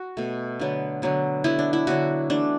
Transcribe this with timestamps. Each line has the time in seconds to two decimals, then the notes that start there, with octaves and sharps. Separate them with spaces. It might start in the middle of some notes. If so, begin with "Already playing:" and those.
Already playing: F#4
0.17 B2 A3
0.60 D3 F#3 B3
1.02 D3 F#3 B3
1.44 D3 F#3 B3 E4
1.59 D4
1.73 E4
1.87 D3 F#3 B3 F#4
2.30 E3 A3 D4